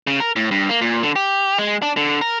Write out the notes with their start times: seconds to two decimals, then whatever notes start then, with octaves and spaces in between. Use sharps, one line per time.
0.07 C#3
0.20 A#4
0.36 A2
0.51 G2
0.69 A#3
0.81 A#2
1.03 D3
1.16 G4
1.59 G#3
1.82 D4
1.97 D3
2.21 A#4